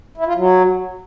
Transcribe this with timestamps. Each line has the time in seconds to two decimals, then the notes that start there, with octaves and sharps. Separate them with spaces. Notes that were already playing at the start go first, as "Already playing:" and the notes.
0.18 E4
0.27 F4
0.36 F#3